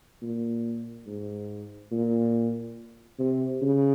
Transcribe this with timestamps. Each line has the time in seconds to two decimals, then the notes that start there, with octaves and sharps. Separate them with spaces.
0.22 A#2
1.06 G#2
1.92 A#2
3.19 C3
3.62 C#3